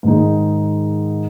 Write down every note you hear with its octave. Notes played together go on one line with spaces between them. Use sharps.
G#2 D#3 G#3 D#4